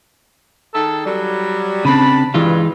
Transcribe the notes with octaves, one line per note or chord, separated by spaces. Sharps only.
D#3 G#4 A4
F#3 G3
C#3 C4 D4 A5 B5
G2 E3 G#3 F4